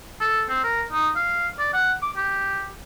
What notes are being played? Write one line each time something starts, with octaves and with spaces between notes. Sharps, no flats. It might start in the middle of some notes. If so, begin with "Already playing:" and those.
A4
C4
A#4
D#4
F5
D5
F#5
D6
G4